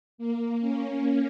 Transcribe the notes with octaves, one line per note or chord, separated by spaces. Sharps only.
A#3
C#4